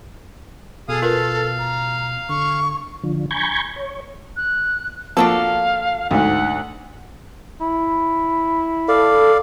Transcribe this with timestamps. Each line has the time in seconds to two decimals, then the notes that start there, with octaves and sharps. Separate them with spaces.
0.89 B2 G#4 A4 F5 D#6
1.02 F4 A#4 B4 F5
1.59 A#5
2.29 D3 C#6
3.03 D3 F3
3.31 G#5 A#5 B5 C#6 G6 G#6
3.76 C#5
4.37 F#6
5.17 F3 A#3 D4 F#4 A4 F5
6.11 D2 G#2 F#5
7.61 E4
8.88 A4 D5 F5